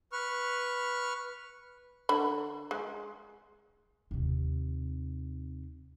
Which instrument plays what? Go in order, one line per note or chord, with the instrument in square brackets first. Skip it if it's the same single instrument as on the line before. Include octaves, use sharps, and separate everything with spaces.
[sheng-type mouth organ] B4 C#6 F6
[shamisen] D3 B5
G#3
[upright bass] D#2 C3